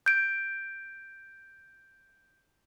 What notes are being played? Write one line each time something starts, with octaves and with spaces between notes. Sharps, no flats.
G6 D7